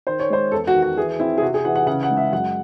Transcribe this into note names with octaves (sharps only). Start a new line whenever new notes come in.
D#3 C5
C#5
G#3 C5
E2 A4
F#4
D#3
F#4
E3 G#4
C4 E4
G#4
C3 F#4
G#4
E3 F#5
F#5
C#3 F#5
F#5
G#3
E5
F#2 F#5